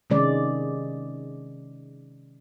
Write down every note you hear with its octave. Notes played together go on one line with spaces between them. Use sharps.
C3 D#3 G#3 C#4 D5